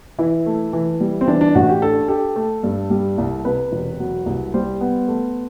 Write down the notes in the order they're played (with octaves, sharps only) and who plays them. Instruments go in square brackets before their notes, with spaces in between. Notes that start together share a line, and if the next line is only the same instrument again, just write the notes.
[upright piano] E3 [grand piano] E4
[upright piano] A3
E3
G3
[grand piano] C4
[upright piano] E3 [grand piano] D4
[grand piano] D4
[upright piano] A1 [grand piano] F#4
[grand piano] G4
[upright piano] D4 [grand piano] A4
[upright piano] G4 [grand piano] A4
[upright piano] A3
G2
G3
C2
[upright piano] C3 [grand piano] B4
[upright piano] E1
F#3
C2
[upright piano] G3 [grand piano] C5
[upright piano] B3
A3